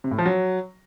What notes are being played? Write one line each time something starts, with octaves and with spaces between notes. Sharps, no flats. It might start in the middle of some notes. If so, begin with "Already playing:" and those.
C3
A2
F3
F#3